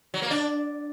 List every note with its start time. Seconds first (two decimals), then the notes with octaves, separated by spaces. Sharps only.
0.14 F#3
0.22 A#3
0.30 D4